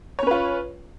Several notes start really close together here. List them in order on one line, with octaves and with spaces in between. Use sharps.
C#5 C#4 B4 F4